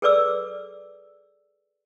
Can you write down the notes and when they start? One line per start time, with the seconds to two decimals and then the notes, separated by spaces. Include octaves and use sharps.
0.02 G#4 A4 B4 D5 D6 E6